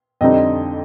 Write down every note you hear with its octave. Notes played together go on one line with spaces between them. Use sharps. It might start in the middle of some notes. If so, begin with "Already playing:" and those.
F2 D3 G3 C4 D#4 D#5